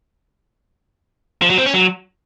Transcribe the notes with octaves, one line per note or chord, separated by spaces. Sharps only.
F3
F#3
C4
C#4
F#3